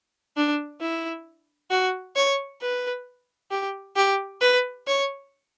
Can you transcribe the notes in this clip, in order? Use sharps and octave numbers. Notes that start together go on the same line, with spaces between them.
D4
E4
F#4
C#5
B4
G4
G4
B4
C#5